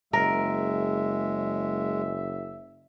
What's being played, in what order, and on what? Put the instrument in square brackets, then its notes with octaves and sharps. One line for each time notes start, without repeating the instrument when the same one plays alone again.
[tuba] F#1 [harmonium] G#3 [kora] A#4 [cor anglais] E5